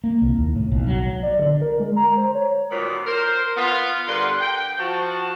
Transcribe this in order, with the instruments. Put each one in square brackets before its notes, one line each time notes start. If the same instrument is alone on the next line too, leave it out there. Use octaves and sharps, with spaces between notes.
[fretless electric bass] A#3
C2
D#2
A2
B1
F#3
[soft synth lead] D5
D3
A#4
G#3
A#5
C5
C#5
[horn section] A#2 D#3 F#3 G3 B3
A#4 C5
B3 F4
G2 D3 A#4 B4 F#5 C6
G5
F3 F#4 A5